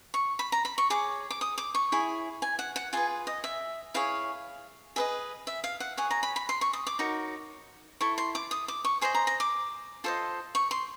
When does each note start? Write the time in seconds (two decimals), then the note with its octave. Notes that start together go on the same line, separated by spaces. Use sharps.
0.14 C#6
0.39 B5
0.52 A#5
0.65 B5
0.78 C#6
0.90 G#4 C#5 D6
1.30 D6
1.41 D#6
1.58 D6
1.75 C#6
1.92 E4 G#4 C#5
2.42 G#5
2.59 F#5
2.76 F#5
2.93 F4 G#4 B4 G#5
3.27 D#5
3.44 E5
3.94 E4 G#4 C#5 F5
4.96 G#4 B4 D#5 E5
5.47 E5
5.64 F5
5.80 F#5
5.97 G#4 C#5 F#5
6.11 A#5
6.23 B5
6.36 B5
6.49 C6
6.61 C#6
6.73 D#6
6.87 D6
6.99 D#4 F#4 A#4 C#5
8.01 E4 A4 C#6
8.18 C6
8.35 D6
8.51 D#6
8.68 D6
8.85 C#6
9.01 G#4 C5 D#5 C6
9.15 A#5
9.27 A#5
9.40 D6
10.04 F4 A4 C5 D#5
10.55 C#6
10.71 C6